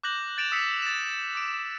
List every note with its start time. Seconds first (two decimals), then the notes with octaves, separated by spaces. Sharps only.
0.03 D6 F#6 G6 A#6 F#7
0.37 G6 A6 D7 E7 F7
0.52 D#6 E6 B6 C#7
0.82 A6 E7
1.35 D6 D7